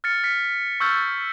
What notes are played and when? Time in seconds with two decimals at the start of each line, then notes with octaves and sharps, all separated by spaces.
0.04 F6 A6 C#7
0.24 F6 B6 C#7
0.80 C#6 E6 F6 G6 A6